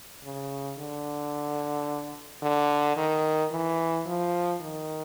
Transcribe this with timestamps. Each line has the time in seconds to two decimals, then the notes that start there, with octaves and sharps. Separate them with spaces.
0.23 C#3
0.78 D3
2.42 D3
2.96 D#3
3.51 E3
4.06 F3
4.61 D#3